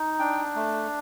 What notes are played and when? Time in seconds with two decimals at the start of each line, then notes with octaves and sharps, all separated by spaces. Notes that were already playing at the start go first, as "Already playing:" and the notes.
Already playing: D#4
0.19 D4 G5
0.56 A3